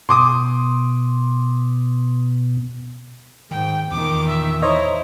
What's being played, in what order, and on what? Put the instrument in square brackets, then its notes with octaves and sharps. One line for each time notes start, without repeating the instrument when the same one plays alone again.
[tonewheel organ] B2 [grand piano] C6 D6 D#6
[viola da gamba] G#2 [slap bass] D#3 [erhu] G5
[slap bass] E2 [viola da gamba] A#2 D#3 [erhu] D6
[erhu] E5
[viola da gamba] D#4 E4 [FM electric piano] C5 C#5 D#5 [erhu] A#5